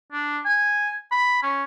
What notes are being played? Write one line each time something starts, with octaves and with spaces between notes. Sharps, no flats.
D4
G#5
B5
C#4